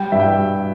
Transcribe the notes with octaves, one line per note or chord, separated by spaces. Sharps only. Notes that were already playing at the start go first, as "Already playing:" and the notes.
Already playing: G3 G5
G2 E5
G5